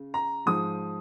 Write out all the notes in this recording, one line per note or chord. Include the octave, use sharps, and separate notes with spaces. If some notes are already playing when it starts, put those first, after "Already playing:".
Already playing: C#3
A#5
G#2 F3 G#3 D#6